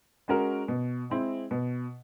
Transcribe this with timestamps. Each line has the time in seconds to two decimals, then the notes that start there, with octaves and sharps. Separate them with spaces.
0.28 G#3 C#4 F#4 A#4
0.68 B2
1.10 G#3 C4 E4
1.51 B2